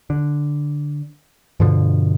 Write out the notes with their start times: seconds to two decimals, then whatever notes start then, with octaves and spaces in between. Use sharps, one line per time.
0.10 D3
1.60 G2 B2 D3 F3